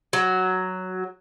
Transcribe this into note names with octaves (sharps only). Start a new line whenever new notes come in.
F#3